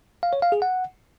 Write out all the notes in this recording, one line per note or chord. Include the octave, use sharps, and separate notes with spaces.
F5
C#5
F5
G#4
F#5